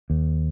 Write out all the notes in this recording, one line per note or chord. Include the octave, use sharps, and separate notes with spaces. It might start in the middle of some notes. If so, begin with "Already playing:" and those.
D#2